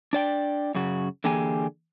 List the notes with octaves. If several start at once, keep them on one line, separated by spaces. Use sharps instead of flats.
D4 D5 G5
F#2 C#3 F#4
D3 E3 A#3 G4 G#4 G#5